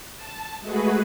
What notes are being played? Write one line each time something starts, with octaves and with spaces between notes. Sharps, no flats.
A5
G#3 A3 F#4 G#4 B4